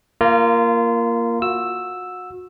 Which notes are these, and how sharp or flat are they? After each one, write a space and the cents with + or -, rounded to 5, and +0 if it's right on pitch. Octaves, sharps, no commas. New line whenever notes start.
A#3 +0 F4 -25 A#5 +0
F#4 -30 E6 +0